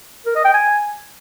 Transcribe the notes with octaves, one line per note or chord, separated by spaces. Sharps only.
A#4
D#5
G5
G#5